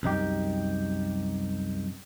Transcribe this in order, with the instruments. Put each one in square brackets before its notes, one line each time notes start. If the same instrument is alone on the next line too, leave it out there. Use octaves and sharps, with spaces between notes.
[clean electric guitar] C2 F#2 D#4 G4